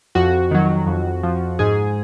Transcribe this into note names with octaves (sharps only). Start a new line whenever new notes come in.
F2 F#4
D#3 F#3
F2
F3
G#2 G#4